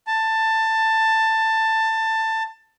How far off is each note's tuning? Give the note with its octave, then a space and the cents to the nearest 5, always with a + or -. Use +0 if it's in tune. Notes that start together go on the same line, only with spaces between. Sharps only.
A5 +15